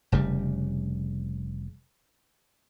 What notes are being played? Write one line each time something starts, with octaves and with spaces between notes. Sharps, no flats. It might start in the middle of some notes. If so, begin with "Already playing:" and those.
F1 C#3 G3